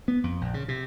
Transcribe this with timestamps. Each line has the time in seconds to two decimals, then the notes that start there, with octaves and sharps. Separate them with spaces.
0.08 B3
0.24 F2
0.41 A#1
0.54 C#3
0.68 C3